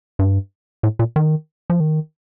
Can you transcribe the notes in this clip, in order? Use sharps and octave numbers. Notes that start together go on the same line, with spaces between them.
G2
A2
A#2
D#3
F3
D#3